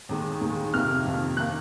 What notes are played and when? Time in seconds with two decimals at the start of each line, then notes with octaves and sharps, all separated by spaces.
0.09 D#2 D#3 G#3
0.41 D#2 D#3 G#3
0.74 F2 C3 D#3 A#3 F6
1.06 F2 C3 D#3 A#3
1.37 D#3 A#3 F#6